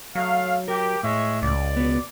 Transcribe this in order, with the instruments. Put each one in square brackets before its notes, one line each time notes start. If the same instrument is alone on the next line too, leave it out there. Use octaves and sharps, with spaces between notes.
[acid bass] F#3 [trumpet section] A3 F5
[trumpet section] G4 [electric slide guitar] A#4
[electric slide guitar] A2 [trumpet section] G#3 C#5 E5
[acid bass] C#2 [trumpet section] D5
[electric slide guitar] B3 F#4